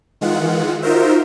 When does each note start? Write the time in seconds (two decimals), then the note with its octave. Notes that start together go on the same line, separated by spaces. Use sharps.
0.21 D#3 E3 G#3 F4 F#5
0.82 D#4 F4 F#4 A#4 C5 E5